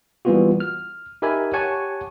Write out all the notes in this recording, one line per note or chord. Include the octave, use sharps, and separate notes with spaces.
E3 G3 A#3 B3 F4 F#4
F6
D#4 G4 A#4 E5 G#5 B5
G4 C#5 F#5 G#5 A5 C#6